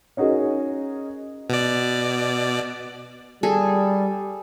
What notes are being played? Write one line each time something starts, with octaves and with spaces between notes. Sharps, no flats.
C#4 D#4 F#4 G#4 A#4
B2 D5
G3 G#4 A4